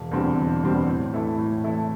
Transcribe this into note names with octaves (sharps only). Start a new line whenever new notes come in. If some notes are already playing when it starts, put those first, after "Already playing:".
Already playing: E1
E2 D3 G3 C4
E1
E2 D3 G3 C4
A2
E3 A3 E4 A4
A2
E3 A3 E4 A4